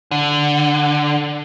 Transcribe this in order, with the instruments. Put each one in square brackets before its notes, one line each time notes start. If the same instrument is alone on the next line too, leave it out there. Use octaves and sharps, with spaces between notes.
[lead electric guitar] D3